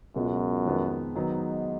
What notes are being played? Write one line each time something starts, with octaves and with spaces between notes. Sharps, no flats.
C#2 F#2 B2 G#3 B3 F4
F2 D#3 G#3 B3
G#2 D#3 F#3 B3 D#4